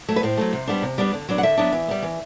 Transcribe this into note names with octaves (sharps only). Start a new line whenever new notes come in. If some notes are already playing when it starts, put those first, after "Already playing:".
F#3 A3
B4
A2 C5
F#3 A3
C3
G3 B3 D4
C3
G3 B3 D4
D3
F#3 B3 D4
F#5
D3 E5
F#3 B3 D4
E3
G3 B3
E3